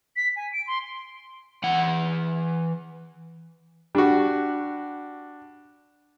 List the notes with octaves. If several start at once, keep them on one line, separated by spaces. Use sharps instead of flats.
B6
G#5
D7
C6
E3 F#5
G3 D4 F#4